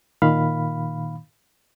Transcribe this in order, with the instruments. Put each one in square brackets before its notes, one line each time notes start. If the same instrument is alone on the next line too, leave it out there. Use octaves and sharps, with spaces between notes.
[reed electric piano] A#2 D#3 F5 B5